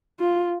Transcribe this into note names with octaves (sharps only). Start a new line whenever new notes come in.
F4